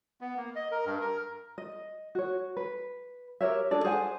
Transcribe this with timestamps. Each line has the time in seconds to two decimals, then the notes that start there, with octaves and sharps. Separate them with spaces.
0.21 B3
0.37 A#3
0.56 D#5
0.72 A#4
0.85 G2
1.01 A#4
1.58 D#5
2.15 F#4 C#5
2.57 B4
3.41 G4 A#4 C#5 E5
3.71 D4 G#4 A4 D5
3.84 G#4 C5 F#5 G#5